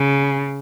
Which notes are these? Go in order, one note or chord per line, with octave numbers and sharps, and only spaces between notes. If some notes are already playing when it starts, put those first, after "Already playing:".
Already playing: C#3